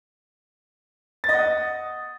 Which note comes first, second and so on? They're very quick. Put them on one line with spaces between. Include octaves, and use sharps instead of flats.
A6 D#5 F#5 D#6